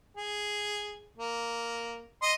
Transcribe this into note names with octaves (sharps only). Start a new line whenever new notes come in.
G#4
A#3
D#5 C6